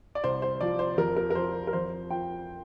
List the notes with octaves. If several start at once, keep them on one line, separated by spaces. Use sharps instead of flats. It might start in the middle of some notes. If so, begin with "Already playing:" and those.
D5
C2 C5
C5
F3 D5
C5
F2 A#4
A#4
A#4
F3 C5
A#4
F2 C5
F3 G5